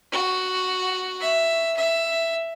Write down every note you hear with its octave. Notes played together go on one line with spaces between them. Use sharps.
F#4
E5
E5